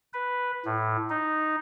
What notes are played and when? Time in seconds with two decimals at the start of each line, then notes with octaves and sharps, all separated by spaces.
0.13 B4
0.65 A2
1.10 D#4